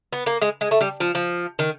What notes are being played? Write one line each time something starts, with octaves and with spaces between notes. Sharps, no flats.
B3
A#3
G#3
G#3
A3
G3
F3
F3
D#3